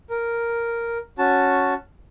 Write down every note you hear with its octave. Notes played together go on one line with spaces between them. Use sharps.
A#4
C#4 F#4 A5